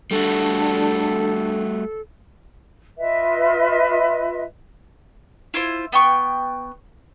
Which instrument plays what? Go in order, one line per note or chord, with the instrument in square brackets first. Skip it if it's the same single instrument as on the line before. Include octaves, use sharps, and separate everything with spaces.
[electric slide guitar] G3 A3 F#4 [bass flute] D4 [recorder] A4
[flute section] F4 B4 D#5 E5
[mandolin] E4 F4 C5
B3 G5 C#6